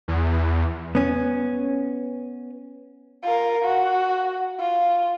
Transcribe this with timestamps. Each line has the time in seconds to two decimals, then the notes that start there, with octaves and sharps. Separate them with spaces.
0.08 E2
0.95 B3 C#4
3.23 F4 A#4
3.65 F#4
4.59 F4